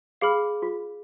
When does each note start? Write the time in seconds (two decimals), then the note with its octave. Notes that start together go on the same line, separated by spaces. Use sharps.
0.21 G#4 F5 B5 F6
0.62 F4